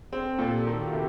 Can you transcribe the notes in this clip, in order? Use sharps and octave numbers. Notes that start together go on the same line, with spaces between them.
C4 G#4
A4
A#2 A4
G4
D#3 F#4
F4
E4
C3